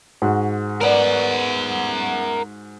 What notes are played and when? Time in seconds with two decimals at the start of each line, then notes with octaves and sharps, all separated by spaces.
0.22 G#2 F#4
0.81 B3 A#4 D5 F#5